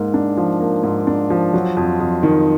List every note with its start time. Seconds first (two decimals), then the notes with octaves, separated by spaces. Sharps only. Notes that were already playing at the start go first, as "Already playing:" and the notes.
Already playing: G#2 A#3
0.14 D4
0.37 F3
0.61 A#3
0.83 G#2
1.07 D4
1.30 F3
1.53 F#3
1.77 F2
2.00 F2
2.23 D#3